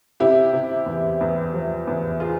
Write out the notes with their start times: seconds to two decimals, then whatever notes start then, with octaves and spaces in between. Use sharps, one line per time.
0.20 C3 E4 G4
0.53 C3
0.86 E2
1.21 E2
1.54 F3
1.87 E2
2.20 F4 G#4